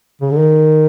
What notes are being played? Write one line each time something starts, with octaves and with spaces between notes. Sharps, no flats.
C#3
D3
D#3